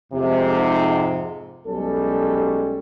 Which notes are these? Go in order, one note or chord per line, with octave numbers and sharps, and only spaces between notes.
F2 G#2 C3
B1 G3 G#3 C#4 A4